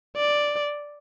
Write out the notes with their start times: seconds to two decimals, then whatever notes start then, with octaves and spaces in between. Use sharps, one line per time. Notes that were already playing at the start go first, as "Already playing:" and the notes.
0.16 D5